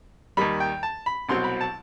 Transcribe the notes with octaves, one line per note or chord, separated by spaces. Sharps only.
D#2 D#3 G3 B5
G5
A5
B5
C2 B2 F#3 C4 C6
B5
A5